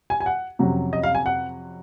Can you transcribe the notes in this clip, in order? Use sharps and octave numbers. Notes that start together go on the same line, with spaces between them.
G#5
G#5
F#5
F2 C3 F#3 C#4
D#5
F5
G#5
F#5